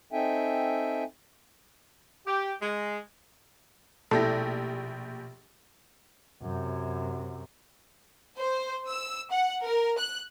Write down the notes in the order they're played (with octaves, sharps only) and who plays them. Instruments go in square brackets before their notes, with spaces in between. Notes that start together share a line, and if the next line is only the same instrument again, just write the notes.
[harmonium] C4 D#4 A4 E5 G5 G#5
[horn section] G4
G#3
[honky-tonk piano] A#1 G4 A#6 [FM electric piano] B2 [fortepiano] A3 E4 [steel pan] A4
[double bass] F#2 C3
[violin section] C5
E6
F#5
A#4
F#6